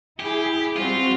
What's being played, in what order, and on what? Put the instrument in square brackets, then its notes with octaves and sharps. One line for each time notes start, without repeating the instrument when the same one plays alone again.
[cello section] E4 G#4 [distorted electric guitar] G4
[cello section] G3 C4 F#4 [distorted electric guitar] F4